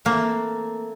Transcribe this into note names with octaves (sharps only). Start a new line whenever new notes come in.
E3 A3 A#3 C4 E4